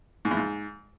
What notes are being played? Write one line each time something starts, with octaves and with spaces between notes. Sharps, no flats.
G#2
E2
G#2